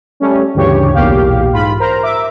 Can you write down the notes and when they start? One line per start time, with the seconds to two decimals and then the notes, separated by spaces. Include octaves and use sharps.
0.20 G3 A3 C#4
0.55 D2 G2 C#3 E3 G4 C#5
0.94 B1 E2 A#2 G4 F5
1.52 G#2 F4 B5
1.80 A#4 C5 A#5
2.03 E5 D6